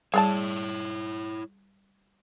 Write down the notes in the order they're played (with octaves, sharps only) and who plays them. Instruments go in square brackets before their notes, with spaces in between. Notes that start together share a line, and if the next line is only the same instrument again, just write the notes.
[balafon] G3 [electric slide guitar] E4 C#5 [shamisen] G#4 D5 A5